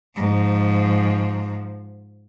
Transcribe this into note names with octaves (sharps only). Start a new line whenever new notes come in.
G#2 F3